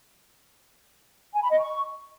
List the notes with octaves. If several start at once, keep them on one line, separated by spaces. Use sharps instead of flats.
G#5
B5
D#5
C#6